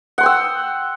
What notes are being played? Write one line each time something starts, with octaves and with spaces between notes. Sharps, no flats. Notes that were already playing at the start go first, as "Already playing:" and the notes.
F#5 G5 C6 E6